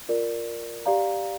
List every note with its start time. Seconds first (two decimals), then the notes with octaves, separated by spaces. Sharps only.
0.09 F4 A#4 D5
0.86 G4 D5 F5 A#5